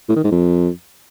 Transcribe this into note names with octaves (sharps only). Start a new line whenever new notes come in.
A2
D#3
G#2
F2